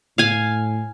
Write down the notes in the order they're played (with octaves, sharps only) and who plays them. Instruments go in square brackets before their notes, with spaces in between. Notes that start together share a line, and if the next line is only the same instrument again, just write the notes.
[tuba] A2 [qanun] F5 G#5